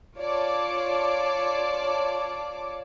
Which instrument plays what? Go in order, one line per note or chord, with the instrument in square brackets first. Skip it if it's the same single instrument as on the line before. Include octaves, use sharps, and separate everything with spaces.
[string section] F4 C#5 D5 A5 D6